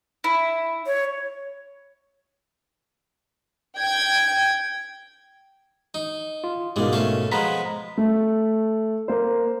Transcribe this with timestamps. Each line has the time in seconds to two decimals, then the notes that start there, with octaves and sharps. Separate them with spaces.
0.24 E4
0.86 C#5
3.77 G5 G#6
5.94 D#4
6.44 F4
6.76 G#2 B2 G3 G#3 A#3
6.93 A3 C#4 F5
7.32 F3 G#3 B3 A#5 B5 B6
7.97 A3
9.08 A#3 C5